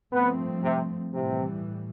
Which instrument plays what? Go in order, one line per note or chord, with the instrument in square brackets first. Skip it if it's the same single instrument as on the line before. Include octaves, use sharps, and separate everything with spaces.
[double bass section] G2 F3 A3 C4 [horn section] B3
[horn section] C3
[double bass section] A2 E3 G3 [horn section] C3